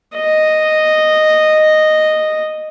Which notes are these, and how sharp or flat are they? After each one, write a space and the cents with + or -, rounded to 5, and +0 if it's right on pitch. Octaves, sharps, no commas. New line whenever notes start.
D#5 -5